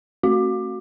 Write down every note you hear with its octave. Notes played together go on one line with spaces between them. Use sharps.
A3 F#4